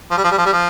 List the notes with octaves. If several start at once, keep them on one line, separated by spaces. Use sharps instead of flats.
F3
G3
F3
G3
F3
G3
F3